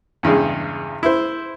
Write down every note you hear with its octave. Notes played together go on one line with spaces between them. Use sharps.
E2 G2 C#3 G#3
E4 C5